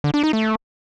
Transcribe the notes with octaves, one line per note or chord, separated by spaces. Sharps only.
D3
D4
D#4
A3